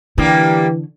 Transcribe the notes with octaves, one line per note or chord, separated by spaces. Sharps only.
D3 E3 G3 A#3 G4